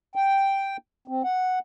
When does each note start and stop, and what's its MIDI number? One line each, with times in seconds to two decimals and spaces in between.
0.15 0.77 79
1.08 1.22 60
1.24 1.59 78